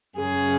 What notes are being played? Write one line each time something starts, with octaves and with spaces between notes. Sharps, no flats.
F#2 C#3 G#4